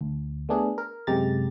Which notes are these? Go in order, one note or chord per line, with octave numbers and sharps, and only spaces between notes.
D2
A3 B3 D4 G#4
A#4
F#2 C3 G#3 G4 A#5 A6